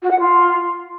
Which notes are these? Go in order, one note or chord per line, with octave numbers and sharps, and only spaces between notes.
F#4
F#5
F4